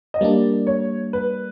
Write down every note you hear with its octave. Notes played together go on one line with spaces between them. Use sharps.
D#5
G3 A#3 D4 D5
C#5
B4